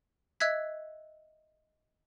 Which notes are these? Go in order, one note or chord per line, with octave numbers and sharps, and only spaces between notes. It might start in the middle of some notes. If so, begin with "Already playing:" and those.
D#5 E5 E6 F#6 G#6 B6